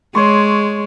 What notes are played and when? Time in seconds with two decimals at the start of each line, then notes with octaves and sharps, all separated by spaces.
0.15 G#3 C#5 C6 C#6